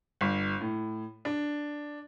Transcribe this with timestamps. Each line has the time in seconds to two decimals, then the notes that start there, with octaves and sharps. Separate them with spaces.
0.21 G1
0.61 A2
1.25 D4